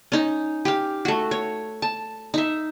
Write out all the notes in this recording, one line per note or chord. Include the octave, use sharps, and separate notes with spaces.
C#4 D#4
G4 F5
A3 F#4
C#5
A5
D#4 E5